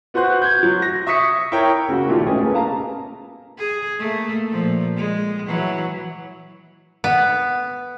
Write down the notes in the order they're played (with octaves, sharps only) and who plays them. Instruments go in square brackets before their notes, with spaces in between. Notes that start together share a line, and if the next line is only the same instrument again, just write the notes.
[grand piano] B3 F#4 C5 C6 F#6
G6 G#6
F#3
A#6
E5 C#6 D#6 B6 C#7
E4 A#4 C#5 G5
[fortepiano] C#3 A#3 F#4 F#5
A#2 D#3 A3 E4 F4 G4
G#3 A3 B3 C#4 G4 G#4
A#3 C#4 G#4 B4
F5 A5 A#5
[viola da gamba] G#4
A3 A#3
A#2 F3
G#3
E3 F#3
[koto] B3